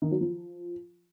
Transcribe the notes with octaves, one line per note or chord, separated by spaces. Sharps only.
D#3
F#3
F3